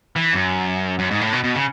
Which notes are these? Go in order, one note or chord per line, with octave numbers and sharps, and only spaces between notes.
E3
F#2
F#2
G#2
A2
B2
B2
C#3